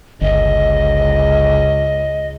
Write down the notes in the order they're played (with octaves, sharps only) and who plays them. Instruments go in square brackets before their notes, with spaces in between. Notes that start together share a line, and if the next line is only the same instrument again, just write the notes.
[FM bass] G1 [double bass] C#2 [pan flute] D#5